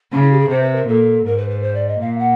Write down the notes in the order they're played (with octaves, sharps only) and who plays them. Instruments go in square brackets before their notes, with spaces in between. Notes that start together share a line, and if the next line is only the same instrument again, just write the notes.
[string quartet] C#3 [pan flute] C#4
[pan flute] E4
G4
G#4
[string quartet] C3 [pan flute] C5
[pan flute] B4
A#4
[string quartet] A#2 [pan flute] A4
[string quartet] G#2 [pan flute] A#4
[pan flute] B4
B4
C5
D5
D#5
[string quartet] A#2 [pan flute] F5
[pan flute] F#5